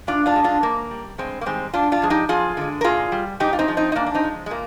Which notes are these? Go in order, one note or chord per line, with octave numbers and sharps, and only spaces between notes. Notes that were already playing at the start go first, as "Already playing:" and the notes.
A#2 D4 F4
D4 F4
G#3
D4 F4
G#2 A#3
G3
G2 G#3 C4
A#3
D#3 G3 G#3 C4
G2 D4 F4
D4 F4
F3 G#3 G#4
D#4 G4
F2 F4 G#4
D3 G#3
A#4
A#2 F4 G#4
G3
G#2 D#4 G4
F4
C4 D#4
F3 G#3
C4 D#4
D#4
G#2 A#3 D4
D4
C4 D#4
F3 G#3
G#3
A#2 A#3